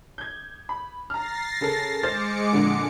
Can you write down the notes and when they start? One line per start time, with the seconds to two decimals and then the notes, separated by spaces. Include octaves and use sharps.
0.18 G6 G#6
0.69 B5
1.10 A#5 F6 A6 A#6 C7
1.61 C#3 A4 A#4
2.03 G#3 C5 D6 F6 A6 C#7
2.53 F2 A#2 D3